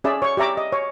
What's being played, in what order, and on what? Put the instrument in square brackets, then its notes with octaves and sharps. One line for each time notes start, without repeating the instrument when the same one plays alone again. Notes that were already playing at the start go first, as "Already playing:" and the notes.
[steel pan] C#4 G#4 D5 E5 E6
C#5 C#6
G4 D5 E5 A#5 D6
D#5
C#5